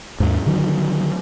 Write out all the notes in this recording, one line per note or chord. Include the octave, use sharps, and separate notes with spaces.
D#2 G#2
D3 D#3 F#3